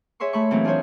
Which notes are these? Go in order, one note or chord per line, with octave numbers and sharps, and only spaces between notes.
G#4 C#5 E5 C6 C#6
A3 B5 C#6
A#2 E3 F#3 C4 C#4
D4 F4 G#4 C5 C#5